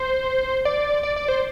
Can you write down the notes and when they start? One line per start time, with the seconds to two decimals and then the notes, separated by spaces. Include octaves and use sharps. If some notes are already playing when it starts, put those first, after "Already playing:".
Already playing: C5
0.65 D5
1.03 D5
1.16 D5
1.28 C5